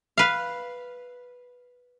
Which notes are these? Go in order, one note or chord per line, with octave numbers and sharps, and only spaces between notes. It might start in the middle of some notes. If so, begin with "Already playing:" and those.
B4 F5